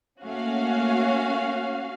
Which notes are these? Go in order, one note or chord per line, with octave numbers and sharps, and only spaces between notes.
A3 A#3 C#4 F#4 F5